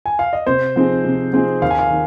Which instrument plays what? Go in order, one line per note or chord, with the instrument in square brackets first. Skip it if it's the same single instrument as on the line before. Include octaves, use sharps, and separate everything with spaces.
[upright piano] G#5
F5
D#5
[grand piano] C3 [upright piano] C5
[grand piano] F3 C4 D#4 G#4
C3
F3 C4 D#4 G#4
[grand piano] D#2 [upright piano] F5
[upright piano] G#5
F5
[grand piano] D#3